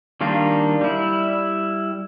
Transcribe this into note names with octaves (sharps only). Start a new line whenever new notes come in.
D#3 G3 A#3 D4 F4
G3 E4